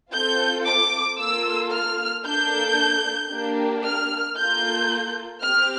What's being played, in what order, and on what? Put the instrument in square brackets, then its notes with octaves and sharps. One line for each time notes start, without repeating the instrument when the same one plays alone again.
[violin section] C4 F4 A4 G6
D6
A#3 F4 A4 E6
F6
A#3 D4 A4 G6
A#3 D4 G4
F6
A#3 F4 A4 G6
C4 G4 F6